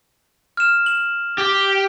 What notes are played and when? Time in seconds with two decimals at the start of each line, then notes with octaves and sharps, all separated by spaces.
0.57 F6 E7
0.86 E7 F#7
1.38 G4